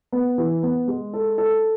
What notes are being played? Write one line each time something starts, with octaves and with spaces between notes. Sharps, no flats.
B3
E3
B3
G#3
A4
A4